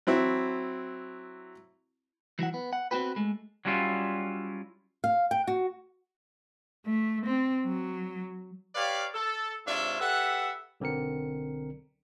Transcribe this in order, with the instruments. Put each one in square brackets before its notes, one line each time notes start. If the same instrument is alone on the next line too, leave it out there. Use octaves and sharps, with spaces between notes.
[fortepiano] F#3 C4 E4
[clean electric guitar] E3 F#3 E4 F#5
B3
F#5
B3 C4 D4 F#4 G4 B4
G#3 A3
[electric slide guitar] F#3 G3 C#4 E4 F4
[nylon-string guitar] F5
G5
F#4
[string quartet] A3
C4
F#3
[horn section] G4 B4 C#5 D5 F5
A4
G#2 C3 D4 F4 C#5 E5
G4 A4 B4 E5 F#5
[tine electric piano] B1 D3 C4 A#4 C#7